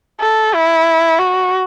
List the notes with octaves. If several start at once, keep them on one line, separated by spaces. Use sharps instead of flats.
A4
E4
F#4